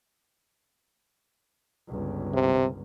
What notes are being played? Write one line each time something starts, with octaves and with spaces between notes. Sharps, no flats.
G1 C#2
C3